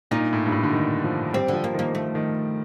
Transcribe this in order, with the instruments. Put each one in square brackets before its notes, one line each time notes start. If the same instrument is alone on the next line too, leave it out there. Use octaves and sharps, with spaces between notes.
[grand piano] A#2 [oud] D#4
[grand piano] A2
G2
A2
D3
D#3
F3
[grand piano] G3 [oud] C4
[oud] D3 [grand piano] F3
[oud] A#3
[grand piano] D#3 [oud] A#3
[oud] A3
[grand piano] D#3